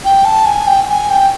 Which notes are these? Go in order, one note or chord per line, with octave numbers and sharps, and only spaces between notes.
G5
A5
G#5
G5
G5
G#5
G5